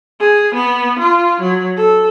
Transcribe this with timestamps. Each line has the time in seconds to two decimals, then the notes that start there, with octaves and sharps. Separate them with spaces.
0.20 G#4
0.55 B3
0.99 F4
1.41 F#3
1.76 A4